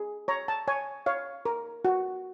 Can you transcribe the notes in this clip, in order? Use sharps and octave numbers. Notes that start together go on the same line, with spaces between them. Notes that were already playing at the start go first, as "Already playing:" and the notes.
Already playing: G#4
C#5 A#5
A5
C#5 G#5
C#5 F5
A#4
F#4